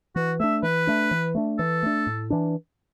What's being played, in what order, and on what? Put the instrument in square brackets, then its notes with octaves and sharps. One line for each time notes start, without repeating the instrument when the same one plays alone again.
[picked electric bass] E3 [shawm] F#4
[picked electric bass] A3 D4 [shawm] E5
[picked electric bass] E3 [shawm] B4
[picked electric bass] A3 D4
E3
A3 D4
[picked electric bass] E3 [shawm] A4
[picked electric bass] A3 D4
A2
E3 D4